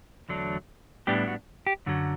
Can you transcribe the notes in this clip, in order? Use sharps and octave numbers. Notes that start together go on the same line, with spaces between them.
E2 D3 F#3 A3 D4
A2 G3 B3 D4 G4
F#4
G4
F#2 D3 F#3